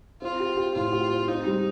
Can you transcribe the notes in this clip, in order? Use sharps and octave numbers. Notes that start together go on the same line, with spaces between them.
C4 F4
G4
G4
A2 F4
G4
C4
C4 D#4
G3